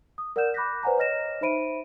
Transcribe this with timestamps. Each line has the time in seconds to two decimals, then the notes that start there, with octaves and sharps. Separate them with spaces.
0.18 D#6
0.36 A#4 D5 F#5 F6 G6 E7
0.54 B5 D6 F#6 G6 A#6 B6
0.83 B4 C5 D5 F#5 G#5 A#5
0.98 C#5 D#5 F6 A#6 E7
1.41 D#4 C5 E5 B5 D7 D#7